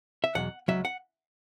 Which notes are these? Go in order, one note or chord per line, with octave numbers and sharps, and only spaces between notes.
E5
E2 B2 F#3 F#5
C#2 B2 F#3 E5
F#5